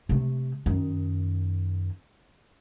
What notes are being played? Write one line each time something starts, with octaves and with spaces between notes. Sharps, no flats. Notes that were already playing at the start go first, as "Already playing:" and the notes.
C3 A3
F#2 D#3